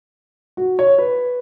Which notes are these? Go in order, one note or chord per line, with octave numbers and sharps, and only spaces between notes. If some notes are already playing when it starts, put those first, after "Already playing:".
F#4
C#5
B4